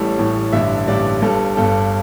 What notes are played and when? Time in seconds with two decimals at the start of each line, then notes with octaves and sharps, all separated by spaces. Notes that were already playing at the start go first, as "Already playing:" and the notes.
Already playing: A1 A2 E3 G3 A4
0.18 A1 A2 E3 G3
0.53 A1 G2 D3 G3 E5
0.87 A1 G2 D3 G3 D5
1.22 G1 G2 G3 A4
1.57 G1 G2 G3 A4